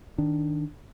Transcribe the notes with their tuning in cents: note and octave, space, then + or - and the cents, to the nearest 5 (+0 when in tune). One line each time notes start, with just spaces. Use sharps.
D#3 +0 D4 +0